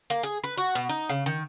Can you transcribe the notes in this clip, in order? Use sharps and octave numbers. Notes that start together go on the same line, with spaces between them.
A#3
G#4
B4
F#4
B2
D#4
C#3
D#3